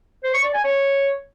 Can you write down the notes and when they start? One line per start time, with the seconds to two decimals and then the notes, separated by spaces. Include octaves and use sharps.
0.24 C5
0.34 C#6
0.44 D5
0.54 G#5
0.64 C#5